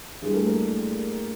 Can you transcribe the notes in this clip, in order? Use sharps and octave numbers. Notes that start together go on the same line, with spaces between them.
G2 E3 G3 G#3 G#4
A3 A4
A#3 A#4